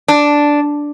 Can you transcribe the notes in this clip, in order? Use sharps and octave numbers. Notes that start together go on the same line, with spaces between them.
D4